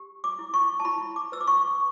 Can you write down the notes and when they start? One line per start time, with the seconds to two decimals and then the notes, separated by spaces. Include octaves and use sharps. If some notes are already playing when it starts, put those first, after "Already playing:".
Already playing: G4
0.24 D6
0.39 E4
0.54 C#6
0.80 A5
0.85 E4 B5
1.16 D6
1.32 B4 E6
1.41 D6
1.47 C#6